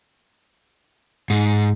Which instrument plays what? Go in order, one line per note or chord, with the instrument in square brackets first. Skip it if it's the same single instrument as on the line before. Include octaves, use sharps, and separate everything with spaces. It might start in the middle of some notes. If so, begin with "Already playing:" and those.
[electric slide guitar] G#2